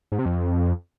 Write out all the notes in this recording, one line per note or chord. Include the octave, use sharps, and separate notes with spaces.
G#2
C3
F2